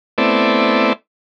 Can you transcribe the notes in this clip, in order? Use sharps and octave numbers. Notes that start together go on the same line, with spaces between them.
A3 B3 C4 E4 D5